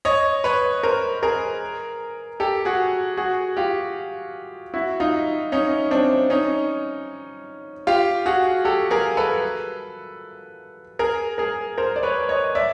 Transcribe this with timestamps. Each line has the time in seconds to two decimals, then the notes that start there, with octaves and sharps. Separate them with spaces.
0.05 C#5 D#5
0.44 B4 C#5
0.83 A#4 C5
1.23 G#4 A#4
2.40 G4 A4
2.65 F#4 G#4
3.17 F#4 G#4
3.57 F4 G4
4.74 E4 F#4
5.00 D#4 F4
5.52 C#4 D#4
5.91 C4 D4
6.30 C#4 D#4
7.87 F4 G4
8.26 F#4 G#4
8.65 G4 A4
8.91 G#4 A#4
9.17 A4 B4
10.99 G#4 A#4
11.38 G#4 A#4
11.78 A#4 C5
11.96 D5
12.03 B4 C#5
12.29 C#5 D#5
12.55 D5 E5